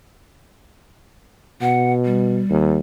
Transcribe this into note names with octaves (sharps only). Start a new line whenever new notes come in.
B2 F#5
G3
D#2